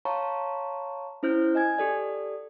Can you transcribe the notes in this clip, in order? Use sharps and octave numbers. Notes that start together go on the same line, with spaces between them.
C#5 F5 A5 A#5 C6 C#6
C#4 E4 C5 F6 G6
D#5 G#5 G#6
G4 A4 D5